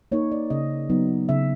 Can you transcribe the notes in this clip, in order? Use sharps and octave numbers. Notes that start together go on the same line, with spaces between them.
A#3 D#4 C#5
D5
C#3 D#5
F#3 B3 D#4
C#3 E5